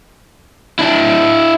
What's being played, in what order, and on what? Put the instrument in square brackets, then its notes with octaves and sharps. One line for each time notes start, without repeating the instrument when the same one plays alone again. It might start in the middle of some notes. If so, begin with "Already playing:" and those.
[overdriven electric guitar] D4 E4